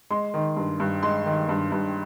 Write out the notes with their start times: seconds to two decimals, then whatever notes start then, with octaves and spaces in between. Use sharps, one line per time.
0.10 G#3 C6
0.34 D#3
0.57 G2
0.80 G2
1.03 G#3 C6
1.26 D#3
1.49 G2
1.72 G2